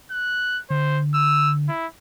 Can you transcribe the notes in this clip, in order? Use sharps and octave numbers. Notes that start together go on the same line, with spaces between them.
F#6
D3 C5
E6
E4